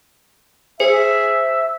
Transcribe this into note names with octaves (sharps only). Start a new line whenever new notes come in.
G#4 C5 E5